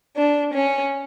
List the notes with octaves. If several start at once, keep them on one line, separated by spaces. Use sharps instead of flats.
D4
C#4